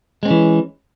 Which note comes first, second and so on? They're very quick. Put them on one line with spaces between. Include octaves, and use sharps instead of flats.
G#3 C4 C#4 E3